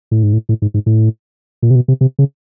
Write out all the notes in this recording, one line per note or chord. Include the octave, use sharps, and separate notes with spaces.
A2
G#2
A2
A2
G#2
G#2
A2
A#2
C3
B2
C3
C3
C#3